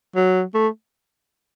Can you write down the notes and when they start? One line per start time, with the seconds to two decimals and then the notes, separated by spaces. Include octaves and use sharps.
0.16 F#3
0.54 A3